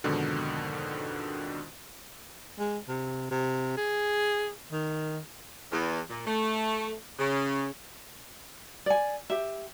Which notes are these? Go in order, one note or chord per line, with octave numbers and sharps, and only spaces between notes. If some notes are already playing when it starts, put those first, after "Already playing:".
F2 G#2 B2 D3 D#3
G#3
C3
C3
G#4
D#3
E2
A#2
A3
C#3
D5 G#5
G4 E5